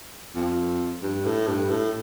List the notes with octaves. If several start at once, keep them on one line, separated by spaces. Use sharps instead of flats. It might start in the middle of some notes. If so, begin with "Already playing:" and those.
F2
G2
A2
G2
A2